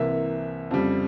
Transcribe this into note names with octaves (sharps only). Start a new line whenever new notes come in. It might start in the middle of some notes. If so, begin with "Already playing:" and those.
Already playing: C2 C3 E3 A#3 E5
F2 C#3 G3